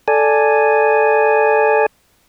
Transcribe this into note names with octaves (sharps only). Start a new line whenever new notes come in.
A4 D5 G#5